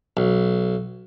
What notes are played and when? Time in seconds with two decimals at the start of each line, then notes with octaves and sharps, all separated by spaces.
0.17 B1